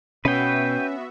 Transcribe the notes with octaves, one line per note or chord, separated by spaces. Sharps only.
B2 B3 C#4 F#4 B4 E5 G5